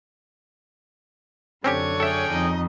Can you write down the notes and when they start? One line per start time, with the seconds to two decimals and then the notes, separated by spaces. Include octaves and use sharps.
1.64 F#2 D3 C4 C#4 G4 C#5
2.00 C#4 G#4 A4 E5 G5
2.30 F2 D#4 D#5